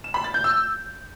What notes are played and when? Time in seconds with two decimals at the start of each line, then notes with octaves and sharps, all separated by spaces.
0.04 E7
0.14 B5
0.24 A6
0.34 G6
0.44 E6